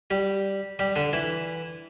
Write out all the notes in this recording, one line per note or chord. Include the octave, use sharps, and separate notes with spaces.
G3 G4
G3 G4
D3 D4
E3 E4